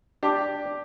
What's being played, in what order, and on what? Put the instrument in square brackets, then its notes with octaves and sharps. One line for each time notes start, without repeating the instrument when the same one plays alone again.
[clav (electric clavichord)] D4 [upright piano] G4 D6